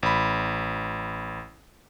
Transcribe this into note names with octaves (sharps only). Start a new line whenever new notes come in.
A1 B5